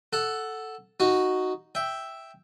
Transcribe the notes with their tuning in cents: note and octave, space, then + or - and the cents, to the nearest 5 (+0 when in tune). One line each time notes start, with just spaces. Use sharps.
A4 +0 F#5 +0
D#4 +0 F#4 +0
E5 +0 G5 +0